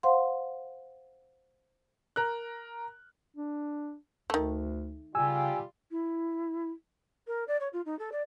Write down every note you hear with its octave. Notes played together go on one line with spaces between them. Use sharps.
C5 F5 F#5 C6
A#4 F#6
D4
D2 D#3 A3
C#3 G3 F4 G4 G#5 E6
E4
A#4
D5
C#5
F4
D#4
A4
D5